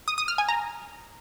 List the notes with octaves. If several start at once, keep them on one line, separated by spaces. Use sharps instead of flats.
D#6
D#6
F6
G#5
A#5